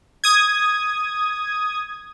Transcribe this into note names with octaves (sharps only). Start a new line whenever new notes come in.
D#6 G#6